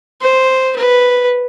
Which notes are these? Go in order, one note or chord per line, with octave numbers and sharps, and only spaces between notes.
C5
B4